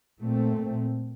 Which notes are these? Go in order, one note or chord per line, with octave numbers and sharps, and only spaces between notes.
A#2 A3 C4